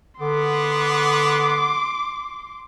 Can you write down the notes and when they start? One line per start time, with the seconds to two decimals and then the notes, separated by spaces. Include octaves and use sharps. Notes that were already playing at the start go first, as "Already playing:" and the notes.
0.20 D3 B3 C6 D6